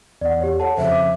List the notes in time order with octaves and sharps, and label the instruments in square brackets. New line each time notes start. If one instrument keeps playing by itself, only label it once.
[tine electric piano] E2 [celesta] D5 F#5
[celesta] G4 C#5
[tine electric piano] A4 [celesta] C#5 F#5 A5
[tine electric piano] F2 C#3 F3 [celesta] C5 [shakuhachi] E5
[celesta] D6